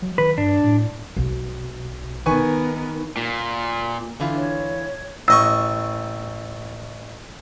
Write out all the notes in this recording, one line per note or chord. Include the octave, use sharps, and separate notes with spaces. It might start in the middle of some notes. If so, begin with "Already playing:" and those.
F#3
D#3 B4
G2 D4
A2
B1
D#3 B3 A#4 B4 G#5 C#6
A#2
D3 E3 F4
C#5
A1 D#5 C#6 E6